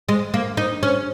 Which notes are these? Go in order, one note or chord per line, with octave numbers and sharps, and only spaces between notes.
G#3
A#3
D#4
C#4